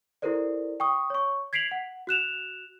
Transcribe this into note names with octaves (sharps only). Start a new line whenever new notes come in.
E4 G4 A4 A#4 C5 D5
G5 C#6 D#6
C#5 C#6
G#6 B6 C7 D7 F7 F#7
F#5
F#4 F#6 E7 F7